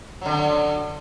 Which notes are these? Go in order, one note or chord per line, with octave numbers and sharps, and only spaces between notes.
D3 F#3